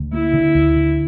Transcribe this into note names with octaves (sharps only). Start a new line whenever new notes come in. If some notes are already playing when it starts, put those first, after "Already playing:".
Already playing: D2
A#3 E4
D3
D2
D3